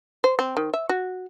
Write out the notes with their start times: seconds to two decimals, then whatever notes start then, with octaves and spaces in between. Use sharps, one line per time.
0.24 C5
0.39 C4
0.57 D#3
0.74 E5
0.89 F#4